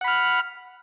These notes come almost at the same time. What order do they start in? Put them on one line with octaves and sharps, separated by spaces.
F#5 B5 F6